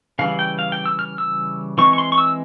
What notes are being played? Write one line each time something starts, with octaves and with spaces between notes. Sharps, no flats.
C#3 E3 G3 F5
G5
F5
G5
E6
F6
E6
E3 G#3 C4 C#6
C#6
C6
C#6
E6